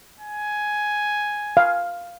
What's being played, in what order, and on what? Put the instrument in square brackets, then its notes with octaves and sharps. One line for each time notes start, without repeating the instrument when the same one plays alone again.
[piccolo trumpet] G#5
[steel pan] F5